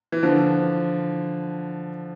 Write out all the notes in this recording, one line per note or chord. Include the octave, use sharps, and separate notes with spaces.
E3
D3 F3